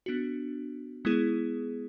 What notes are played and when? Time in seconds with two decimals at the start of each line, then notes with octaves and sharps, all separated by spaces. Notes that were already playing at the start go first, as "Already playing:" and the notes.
0.06 B3 D4 F#4
1.05 G#3 B3 E4 G#4